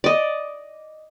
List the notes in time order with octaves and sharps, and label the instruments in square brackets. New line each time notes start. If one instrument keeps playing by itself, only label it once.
[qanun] D5 D#5